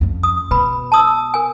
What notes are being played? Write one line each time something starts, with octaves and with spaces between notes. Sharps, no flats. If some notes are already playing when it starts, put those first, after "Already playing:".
F2 C#4
D#6
B2 B4 B5
A5 D#6 E6
A#4 G#5